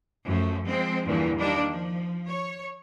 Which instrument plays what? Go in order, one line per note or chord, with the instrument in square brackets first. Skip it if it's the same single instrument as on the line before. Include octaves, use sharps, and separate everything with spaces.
[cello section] F#2 F3 A3
F3 G#3 C4
E2 G2 A#2 D3 E3
D#3 G3 A#3 D4
F3
C#5